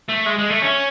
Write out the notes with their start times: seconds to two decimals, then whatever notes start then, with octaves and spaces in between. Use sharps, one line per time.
0.09 A3
0.27 G#3
0.39 G#3
0.51 A3
0.62 C#4